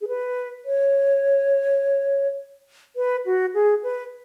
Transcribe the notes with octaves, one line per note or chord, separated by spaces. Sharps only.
G#4
B4
C#5
B4
F#4
G#4
B4